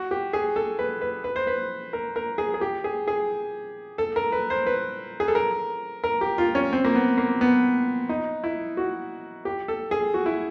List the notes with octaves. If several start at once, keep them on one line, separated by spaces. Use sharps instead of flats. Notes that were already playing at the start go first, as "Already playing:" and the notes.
Already playing: F#4
G4
G#4
A4
B4
B4
B4
C5
B4
A#4
A#4
G#4
G#4
G4
G#4
G#4
A4
A#4
B4
C5
B4
G#4
A4
A#4
A#4
G4
F4
C#4
C4
A#3
B3
A#3
B3
D#4
E4
F#4
G4
A4
G#4
F#4
E4